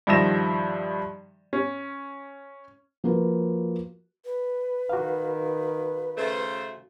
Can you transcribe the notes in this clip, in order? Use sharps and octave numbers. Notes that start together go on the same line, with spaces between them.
G2 D#3 F3 E5 A#6 E7
C#4
F3 A#3 F#4 A#4 B4
B4
D#3 F#4 F5
C#3 A3 C5